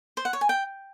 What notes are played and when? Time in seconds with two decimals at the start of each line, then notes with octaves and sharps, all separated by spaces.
0.17 C5
0.25 F#5
0.33 C#5
0.41 G#5
0.49 G5